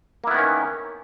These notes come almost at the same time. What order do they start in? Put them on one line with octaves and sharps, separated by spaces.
A#3 E4 B3 D#3 C#4